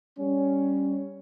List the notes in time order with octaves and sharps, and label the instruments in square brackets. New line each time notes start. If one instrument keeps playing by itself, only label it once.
[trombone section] G3 C#4